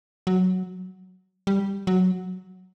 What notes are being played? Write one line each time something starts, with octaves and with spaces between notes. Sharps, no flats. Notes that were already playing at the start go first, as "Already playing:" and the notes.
F#3
G3
F#3